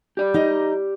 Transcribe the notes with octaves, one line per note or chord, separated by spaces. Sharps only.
G4 D5
D#4 D#5 A#5